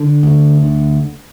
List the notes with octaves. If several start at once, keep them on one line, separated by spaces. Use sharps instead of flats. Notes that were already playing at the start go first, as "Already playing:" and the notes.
Already playing: D3
D2
D3